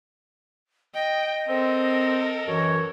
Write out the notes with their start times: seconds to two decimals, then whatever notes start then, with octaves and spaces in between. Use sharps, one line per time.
0.94 D#5 G5
1.48 C4 A4 A#4
2.46 F#2 E3 C#5